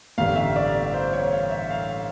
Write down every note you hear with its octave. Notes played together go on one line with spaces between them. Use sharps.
A1 G2 D3 G3 F5
E5
D5
C5
C#5
F5
E5
F5